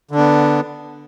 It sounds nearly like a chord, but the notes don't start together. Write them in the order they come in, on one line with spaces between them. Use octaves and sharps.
D3 D4 B3